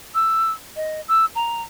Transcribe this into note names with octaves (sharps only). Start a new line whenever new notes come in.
E6
D#5
E6
A#5